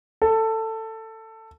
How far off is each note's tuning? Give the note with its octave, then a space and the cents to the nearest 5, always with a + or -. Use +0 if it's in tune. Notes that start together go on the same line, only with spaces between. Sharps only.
A4 +15